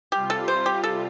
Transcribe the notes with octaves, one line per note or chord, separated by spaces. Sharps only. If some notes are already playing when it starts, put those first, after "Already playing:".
C3 G3 F4 G4
A4
C5
G4
A4